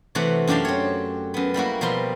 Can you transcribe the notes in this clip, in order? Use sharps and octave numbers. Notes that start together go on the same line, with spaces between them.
C3 E3 A3 F#4 F#5
F#2 D4 F#4 G4 F5 A5
C4 C#5
F#2 B3
G3 A#3 E4 F#4
B2 F3 G3 A#4 C6